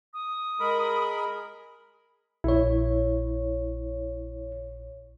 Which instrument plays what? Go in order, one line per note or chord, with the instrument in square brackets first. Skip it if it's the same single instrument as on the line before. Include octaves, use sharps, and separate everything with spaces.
[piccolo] D#6
[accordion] G#3 A#4 B5
[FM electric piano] A#1 C#5 [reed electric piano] E4